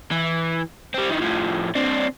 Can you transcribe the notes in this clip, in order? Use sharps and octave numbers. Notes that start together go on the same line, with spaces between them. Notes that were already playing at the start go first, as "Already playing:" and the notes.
E3
G3 C4
D#3 E3
A2 F3
C4 D4